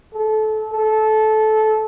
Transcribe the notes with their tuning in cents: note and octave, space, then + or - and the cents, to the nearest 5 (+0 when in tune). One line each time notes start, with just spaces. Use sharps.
A4 -25
A4 -20